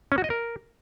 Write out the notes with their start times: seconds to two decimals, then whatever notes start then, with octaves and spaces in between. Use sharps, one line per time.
0.12 C#4
0.18 F#4
0.24 D#5
0.30 A#4